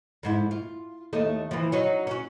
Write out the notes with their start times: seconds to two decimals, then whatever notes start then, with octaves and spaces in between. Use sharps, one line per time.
0.23 F2 G#2 E4
0.51 F4
1.13 D#2 A3 D#5
1.51 E3 F3
1.72 F#3 C#4 D#4
2.07 C#4 F#4